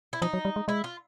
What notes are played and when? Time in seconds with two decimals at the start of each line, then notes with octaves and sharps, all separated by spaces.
0.13 E4
0.22 F3 D#4
0.34 F#3
0.45 G3
0.56 G#3
0.68 G#3 E4
0.84 F4